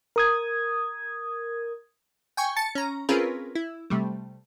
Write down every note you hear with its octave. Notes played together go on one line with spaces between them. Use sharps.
A#4 D#6 G#6
G5 G#5 C#6
A5 A6 C#7
C#4 A#5
C4 C#4 F4 G#4 A#4 B4
E4
C3 G3 A3